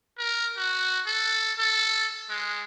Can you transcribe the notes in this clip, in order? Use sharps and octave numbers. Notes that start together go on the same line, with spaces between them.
A#4
F#4
A4
A4
G#3